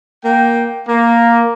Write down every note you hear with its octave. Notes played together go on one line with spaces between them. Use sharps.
A#3 G5
A#3